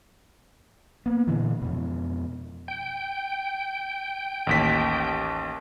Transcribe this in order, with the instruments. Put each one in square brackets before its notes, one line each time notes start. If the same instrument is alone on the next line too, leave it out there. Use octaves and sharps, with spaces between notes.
[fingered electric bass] A#3 B3
A#2 D3 E3
F2 B2
[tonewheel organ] G5
[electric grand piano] A1 D#2 B6